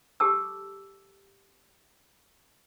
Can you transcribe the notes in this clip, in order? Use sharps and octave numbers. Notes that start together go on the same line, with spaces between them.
G4 A4 A5 D6 E6